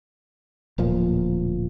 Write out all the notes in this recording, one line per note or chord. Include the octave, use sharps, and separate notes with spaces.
D1 A#2 F3